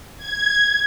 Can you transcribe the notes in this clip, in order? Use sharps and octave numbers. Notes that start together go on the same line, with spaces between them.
G#6